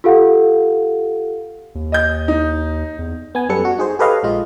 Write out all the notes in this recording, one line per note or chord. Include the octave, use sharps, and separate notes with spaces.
F4 G4 A4 F5 F#5
D#2
D#5 G6
D#4
E2
B3 G#5
F#2 G3 B3 A4 B4 C#7
F#4
D#4 G#4 C5
G4 A4 B4 C#5 D#5 F5
A#1 G#3 F4 D#5